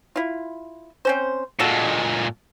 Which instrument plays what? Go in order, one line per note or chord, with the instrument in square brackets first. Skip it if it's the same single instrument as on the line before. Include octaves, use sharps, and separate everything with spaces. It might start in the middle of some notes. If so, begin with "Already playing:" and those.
[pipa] E4 F4
C4 C#4 C5
[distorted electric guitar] A#2 G#3 [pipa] F#4 A4